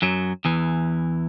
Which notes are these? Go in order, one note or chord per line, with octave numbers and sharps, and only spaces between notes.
F#2 F#3
E2 E3